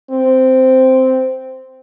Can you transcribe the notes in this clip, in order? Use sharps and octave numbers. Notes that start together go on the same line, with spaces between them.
C4